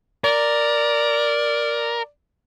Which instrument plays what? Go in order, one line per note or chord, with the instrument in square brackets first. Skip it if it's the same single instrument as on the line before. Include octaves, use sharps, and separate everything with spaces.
[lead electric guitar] A#4 [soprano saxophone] D5